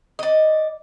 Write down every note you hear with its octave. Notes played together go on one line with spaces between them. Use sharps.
D5 D#5